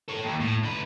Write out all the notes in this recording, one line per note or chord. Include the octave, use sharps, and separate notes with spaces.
A4 C#5
D#2
A2
D3 B4